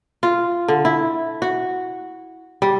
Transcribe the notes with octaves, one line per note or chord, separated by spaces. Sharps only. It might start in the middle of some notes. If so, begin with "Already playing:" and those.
F4
D3
E4
F#4
G3